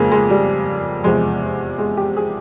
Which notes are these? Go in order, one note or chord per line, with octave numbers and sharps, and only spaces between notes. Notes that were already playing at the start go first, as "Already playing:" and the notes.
Already playing: F2 C#3 G#3 A#3
G#3
G3
E2 C3 F3 G#3
G#3
G4
G#4